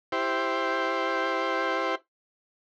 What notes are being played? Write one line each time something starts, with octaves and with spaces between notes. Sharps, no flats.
E4 G4 C5